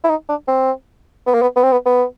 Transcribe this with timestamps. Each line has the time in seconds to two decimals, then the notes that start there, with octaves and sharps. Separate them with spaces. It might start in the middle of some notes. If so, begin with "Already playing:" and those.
0.04 E4
0.09 D#4
0.29 D4
0.48 C4
1.27 B3
1.34 A#3
1.42 B3
1.56 B3
1.63 C4
1.72 B3
1.86 B3